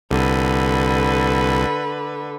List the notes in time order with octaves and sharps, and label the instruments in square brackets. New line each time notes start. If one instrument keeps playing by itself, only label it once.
[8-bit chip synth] C2 [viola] D3 B4